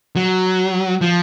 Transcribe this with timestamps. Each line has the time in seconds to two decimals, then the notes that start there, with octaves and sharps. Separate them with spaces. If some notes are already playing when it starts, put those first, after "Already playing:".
0.16 F#3
1.01 F3